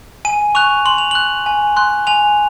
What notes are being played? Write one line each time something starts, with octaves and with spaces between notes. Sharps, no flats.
G#5 D#7
C#6 F#6 F7
C6 F#7
F7
F#6 F#7
G#5
C6 F#6
G#5 F7